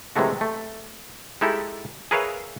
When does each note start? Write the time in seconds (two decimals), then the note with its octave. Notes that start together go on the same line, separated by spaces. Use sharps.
0.15 C3 E3 F#3 G#3 A3 F#4
0.41 A3
1.41 G#3 D#4 E4 G4 A4
2.11 G#4 A#4 B4 C#5 E5 F5